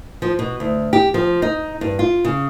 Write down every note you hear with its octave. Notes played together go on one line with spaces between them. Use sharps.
F3
B2
D2
G4
F3
D#4
G2
F4
C#3